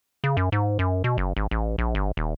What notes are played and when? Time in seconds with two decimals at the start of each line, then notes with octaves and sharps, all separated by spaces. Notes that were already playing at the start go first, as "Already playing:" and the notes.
0.24 C#3
0.37 F#2
0.52 G#2
0.79 F#2
1.04 B2
1.18 F#1
1.37 G#1
1.51 A1
1.78 A#1
1.95 G1
2.17 D#1